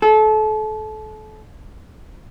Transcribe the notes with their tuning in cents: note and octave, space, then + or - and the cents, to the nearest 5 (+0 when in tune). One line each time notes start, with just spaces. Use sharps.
A4 -30